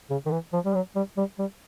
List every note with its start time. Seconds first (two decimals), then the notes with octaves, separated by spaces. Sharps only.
0.10 C#3
0.26 D#3
0.32 E3
0.53 F3
0.65 G3
0.75 F#3
0.96 G3
1.18 G3
1.39 G3